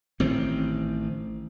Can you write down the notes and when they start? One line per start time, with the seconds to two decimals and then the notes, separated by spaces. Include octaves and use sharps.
0.20 A1 D#3 C4